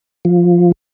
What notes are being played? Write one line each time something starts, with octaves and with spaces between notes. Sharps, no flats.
F3